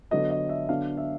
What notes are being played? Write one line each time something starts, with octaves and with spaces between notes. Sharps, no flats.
D3 F#3 B3 D#5
D#5
E5
D3 F#3 B3 D4 F5
E5